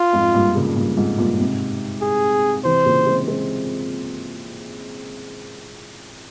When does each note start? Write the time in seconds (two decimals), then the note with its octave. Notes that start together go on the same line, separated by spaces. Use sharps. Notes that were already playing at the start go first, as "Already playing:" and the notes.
Already playing: F4
0.13 F2 G#2
0.34 G2 A#2
0.55 A#2 C#3
0.76 G2 A#2
0.97 F2 G#2
1.18 G2 A#2
1.35 A#2
1.39 G#2 C3
2.02 G#4
2.65 C3 E3 C5
2.86 A#2 C#3
3.06 G#3 C4
3.28 G#3 C4